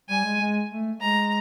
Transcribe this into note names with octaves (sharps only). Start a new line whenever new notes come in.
G3 G#5
G#3
G#3
A3
G#3 A#5